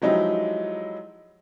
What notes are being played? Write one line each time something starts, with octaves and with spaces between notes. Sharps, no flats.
F3 F#3 G#3 D#4 E4 G4